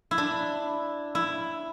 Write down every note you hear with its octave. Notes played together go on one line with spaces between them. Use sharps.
E4
D4
E4